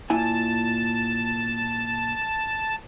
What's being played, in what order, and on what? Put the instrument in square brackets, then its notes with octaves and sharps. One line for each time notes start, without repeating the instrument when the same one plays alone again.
[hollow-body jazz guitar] A#2 E4 G#5 [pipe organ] A5